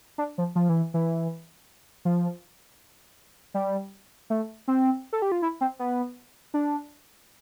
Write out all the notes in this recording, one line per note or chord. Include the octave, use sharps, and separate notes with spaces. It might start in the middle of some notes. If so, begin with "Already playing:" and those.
D4
F3
F3
E3
E3
F3
G3
A3
C4
A4
G4
F4
E4
C4
B3
D4